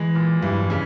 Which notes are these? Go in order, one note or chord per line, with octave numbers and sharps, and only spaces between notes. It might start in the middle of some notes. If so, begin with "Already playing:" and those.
Already playing: E3 G#3
A#2
G2 E3 G3
C#3 G#3